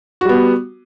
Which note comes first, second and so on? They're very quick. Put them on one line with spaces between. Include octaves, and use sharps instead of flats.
F#4 G3 B3